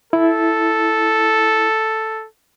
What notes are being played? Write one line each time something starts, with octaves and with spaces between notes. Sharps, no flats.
E4 A4